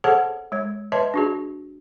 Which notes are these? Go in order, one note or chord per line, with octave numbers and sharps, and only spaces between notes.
G#4 A4 C5 C#5 F#5 A5
G#3 C#5
B4 C#5 D#5 E5 A5 C6
D4 F#4 G#4